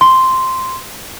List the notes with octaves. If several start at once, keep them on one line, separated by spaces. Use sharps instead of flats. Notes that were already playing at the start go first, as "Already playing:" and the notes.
C6